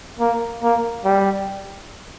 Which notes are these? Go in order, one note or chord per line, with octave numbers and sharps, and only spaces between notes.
A#3
A#3
G3